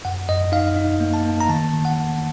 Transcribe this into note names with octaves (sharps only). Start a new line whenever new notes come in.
F#2 F#5
F#2 D#5
D#4 F5
D#4
A#3
A5
A#3
A#5
D#3 A5
D#3
F#5
D#3